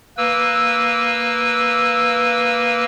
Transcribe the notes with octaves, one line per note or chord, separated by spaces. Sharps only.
A#3 B4 E6